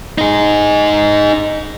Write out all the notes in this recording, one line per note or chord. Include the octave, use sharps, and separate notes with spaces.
D#4 G#4